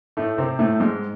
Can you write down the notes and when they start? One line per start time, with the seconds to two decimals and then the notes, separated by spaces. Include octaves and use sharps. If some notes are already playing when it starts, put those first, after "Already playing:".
0.17 A2 A3
0.38 C3 C4
0.59 A2 A3
0.80 G#2 G#3